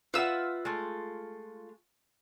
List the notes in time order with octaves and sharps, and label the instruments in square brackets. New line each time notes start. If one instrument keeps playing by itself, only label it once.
[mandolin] F4 E6 [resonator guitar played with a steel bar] B4 E5 F#5
[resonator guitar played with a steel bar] G#3 A3